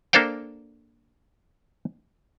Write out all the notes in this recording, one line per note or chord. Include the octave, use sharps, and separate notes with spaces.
A#3 D4 A4 C5 F5 G5